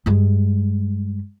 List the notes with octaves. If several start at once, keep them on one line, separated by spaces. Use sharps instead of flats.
G2 G#3